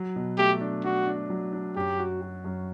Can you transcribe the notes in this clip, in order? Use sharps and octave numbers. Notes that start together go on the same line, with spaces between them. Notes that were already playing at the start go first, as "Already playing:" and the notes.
Already playing: F#3
B2
A3 G4
D4
D4 F#4
D4
F#3
D4
F#2 G4
F#4
F#4
F#2